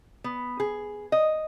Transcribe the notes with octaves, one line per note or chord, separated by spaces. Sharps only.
B3
G#4
D#5